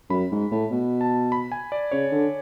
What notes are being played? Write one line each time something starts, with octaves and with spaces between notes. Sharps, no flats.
F#2 B5
G#2
A2
B2
A5
B5
G#5
D5
C#3 C#5
D3